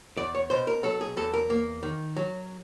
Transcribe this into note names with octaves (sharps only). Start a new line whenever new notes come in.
E2 D5
C#5
B2 C5
A#4
F#3 A4
G#4
E2 A4
A#4
A#3
D#3
F#3